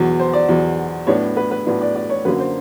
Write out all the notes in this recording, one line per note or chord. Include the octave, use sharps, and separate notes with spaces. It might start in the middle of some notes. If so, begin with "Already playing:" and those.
Already playing: E2 B2 F#3
C5
D5
E2 B2 F#3
A2 F#3 B3 D4 C#5
B4
B4
A2 F#3 B3 D4
D5
D5
C#5
F#2 D3 F#3 A#3 B4
C5